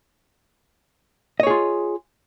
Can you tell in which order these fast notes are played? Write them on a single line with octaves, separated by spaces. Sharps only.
D#5 C#5 G#4 F4